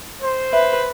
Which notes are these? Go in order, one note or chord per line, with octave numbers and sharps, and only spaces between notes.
C5
B4 E5